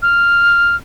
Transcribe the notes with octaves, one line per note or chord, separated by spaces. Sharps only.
F6